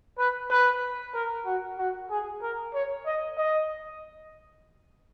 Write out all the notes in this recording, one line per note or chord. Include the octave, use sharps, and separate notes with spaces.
B4
B4
A#4
F#4
F#4
G#4
A#4
C#5
D#5
D#5